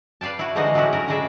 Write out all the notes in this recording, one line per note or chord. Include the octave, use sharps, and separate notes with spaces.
B4 D5 F5 G5 A5
E4 F#4
D3 E3 F3 G#3 D#4 F#4
A2 F#3 C#4 D4 E4 F#4
A2 F#4 A#4
A2 C#3 G#3 G#4 D5 E5